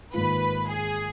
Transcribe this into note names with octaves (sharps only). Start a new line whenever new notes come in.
G#2 D#3 A#3 F4 B4
G#4